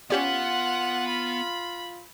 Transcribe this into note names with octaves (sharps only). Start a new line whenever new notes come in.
B3 C#4 F4 G4 D5 F#5
B5